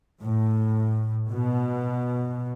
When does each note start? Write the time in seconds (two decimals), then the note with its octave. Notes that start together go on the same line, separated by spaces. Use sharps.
0.22 A2
1.30 B2